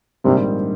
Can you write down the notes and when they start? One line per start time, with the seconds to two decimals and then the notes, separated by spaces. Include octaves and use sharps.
0.24 A#1 G#2 C3 D#3 G3 C4